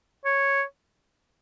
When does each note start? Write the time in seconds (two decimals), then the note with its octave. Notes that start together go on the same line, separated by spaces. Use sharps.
0.25 C#5